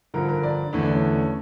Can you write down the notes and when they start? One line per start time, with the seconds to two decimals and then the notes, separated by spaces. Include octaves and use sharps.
0.14 G2 D3 F3 A#4
0.29 A#4
0.43 D5
0.73 E2 D3 A3 E4
0.83 D4
0.92 C#4